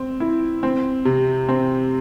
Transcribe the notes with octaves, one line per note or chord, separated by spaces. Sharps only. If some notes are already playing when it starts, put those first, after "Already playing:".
Already playing: C4
E4
C4
C3
C4